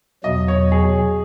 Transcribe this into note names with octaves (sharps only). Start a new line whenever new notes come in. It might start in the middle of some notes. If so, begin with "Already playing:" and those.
E2 B2 F#3 D#5
C#5
G#4